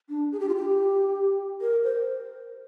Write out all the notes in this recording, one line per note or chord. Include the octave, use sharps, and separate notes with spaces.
D4
G#4
G4
F4
G4
A#4
C5